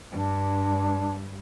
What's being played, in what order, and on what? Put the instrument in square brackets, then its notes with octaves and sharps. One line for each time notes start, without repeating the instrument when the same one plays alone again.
[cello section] G2 [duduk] D4